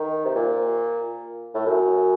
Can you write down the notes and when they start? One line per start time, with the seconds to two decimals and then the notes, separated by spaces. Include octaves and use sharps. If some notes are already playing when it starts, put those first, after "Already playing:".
Already playing: D#3
0.25 C3
0.35 A#2
1.54 A2
1.66 F#2